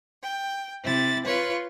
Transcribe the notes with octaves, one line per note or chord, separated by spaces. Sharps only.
G5
C3 E4 A6
F4 B4 C#5